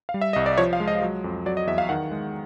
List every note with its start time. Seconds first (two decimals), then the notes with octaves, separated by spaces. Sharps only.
0.09 F5
0.14 G3
0.21 E5
0.33 C2 D#5
0.46 D5
0.58 F3 C#5
0.73 F5
0.80 G#3
0.88 D#5
1.02 F#3
1.24 F2
1.46 F#3 D5
1.57 D#5
1.67 E2 E5
1.78 F5
1.89 D#3 F#5
2.11 G#3